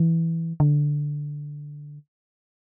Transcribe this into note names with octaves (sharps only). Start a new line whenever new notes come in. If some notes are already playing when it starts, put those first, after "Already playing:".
Already playing: E3
D3